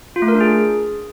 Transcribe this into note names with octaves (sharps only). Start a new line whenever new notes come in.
F4
A3
A#4
D4
G#4